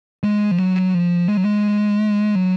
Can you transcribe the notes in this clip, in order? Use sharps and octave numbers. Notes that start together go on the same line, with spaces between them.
G#3
F3
F#3
F3
G#3
F#3
G#3
F#3